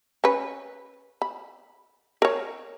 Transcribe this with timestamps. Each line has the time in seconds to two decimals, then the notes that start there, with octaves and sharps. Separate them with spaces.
0.24 C#4 B4
1.22 B5
2.22 A#4 C#5